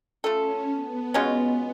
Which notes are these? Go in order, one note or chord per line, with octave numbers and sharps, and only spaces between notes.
A3 C#4 F4 A4
B3
B2 G#3 C#4 F4